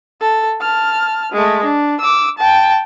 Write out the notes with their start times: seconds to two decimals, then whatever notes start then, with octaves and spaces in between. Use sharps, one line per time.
0.21 A4
0.61 A5 F6
1.32 G#3 A3
1.64 D4
2.01 D6 E6
2.38 G5 A5